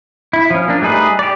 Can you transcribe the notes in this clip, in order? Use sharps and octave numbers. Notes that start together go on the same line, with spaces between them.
E4
F3 C#4
A#3 D4
G3 A3 D#4 G#4 B4
G4 D5